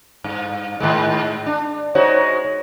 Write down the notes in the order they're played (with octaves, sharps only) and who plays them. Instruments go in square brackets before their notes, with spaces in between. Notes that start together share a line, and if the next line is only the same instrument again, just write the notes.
[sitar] G2
G#2 D#3 G#3
D4
[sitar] G#3 D#4 F#4 [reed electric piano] C5 C#5